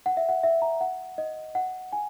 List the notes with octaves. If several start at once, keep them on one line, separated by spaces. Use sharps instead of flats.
F#5
E5
F#5
E5
A#5
F#5
D#5
F#5
G#5